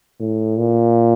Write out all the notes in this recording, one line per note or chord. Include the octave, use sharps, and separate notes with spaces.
A2
A#2